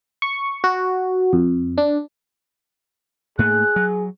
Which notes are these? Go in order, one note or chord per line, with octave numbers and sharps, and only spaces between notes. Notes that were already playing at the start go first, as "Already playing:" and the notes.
C#6
F#4
F2
D4
G#2 A3 A#3 G#4 F#6
F#3